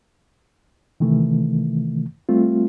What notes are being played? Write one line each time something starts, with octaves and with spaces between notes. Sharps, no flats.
C3 D#3 E3 A3
G3 A3 C4 F4